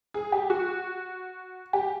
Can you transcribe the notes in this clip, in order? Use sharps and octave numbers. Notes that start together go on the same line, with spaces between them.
G#4
G4
F#4
G4